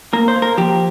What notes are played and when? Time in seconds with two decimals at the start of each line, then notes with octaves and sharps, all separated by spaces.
0.13 A#3 A#4
0.28 C5
0.36 A#3
0.42 A#4
0.57 F3 G4